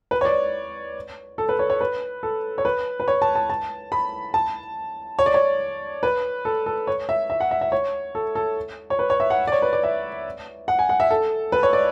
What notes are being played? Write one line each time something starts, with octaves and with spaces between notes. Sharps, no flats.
B4
C#5
D5
A4
B4
C#5
C#5
B4
A4
C#5
B4
B4
C#5
A5
A5
A5
B5
A5
C#5
D5
C#5
B4
A4
A4
C#5
E5
E5
F#5
E5
E5
C#5
A4
A4
C#5
B4
C#5
E5
F#5
D5
C#5
B4
D5
E5
F#5
G#5
F#5
E5
A4
B4
C#5
D5